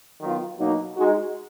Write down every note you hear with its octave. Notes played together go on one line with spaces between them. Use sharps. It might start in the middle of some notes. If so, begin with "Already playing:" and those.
D#3 F#3 B3 F4
B2 F#3 A#3 D#4
G#3 D#4 F#4